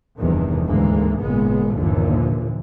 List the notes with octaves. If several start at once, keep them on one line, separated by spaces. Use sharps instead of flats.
F1 E2 G2 C3 D#3
D2 G#2 E3 G#3 A#3
G#1 A#2 C#3 G#3 B3
G1 D#2 A#2 D3 E3 F3